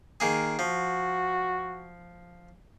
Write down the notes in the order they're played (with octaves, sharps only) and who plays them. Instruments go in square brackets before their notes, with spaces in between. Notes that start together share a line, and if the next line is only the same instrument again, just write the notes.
[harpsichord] D#3 A#3 G#4
[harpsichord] F3 [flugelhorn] F#4